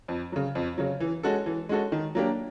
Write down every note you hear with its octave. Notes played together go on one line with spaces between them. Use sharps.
F2
C#3 F#3
F2
C#3 F#3
E3
G#3 C#4 F#4 A4
E3
G#3 C#4 F#4 A4
D#3
F#3 A#3 D4 G4